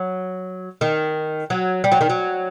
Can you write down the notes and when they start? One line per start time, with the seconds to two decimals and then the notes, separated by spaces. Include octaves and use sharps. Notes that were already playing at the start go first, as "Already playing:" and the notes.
Already playing: F#3
0.81 D#3
1.50 F#3
1.84 G3
1.92 F#3
2.01 D#3
2.09 F#3